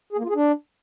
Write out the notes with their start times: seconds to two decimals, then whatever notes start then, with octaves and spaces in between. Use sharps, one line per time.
0.13 G#4
0.18 A#3
0.24 F4
0.30 G#4
0.35 D4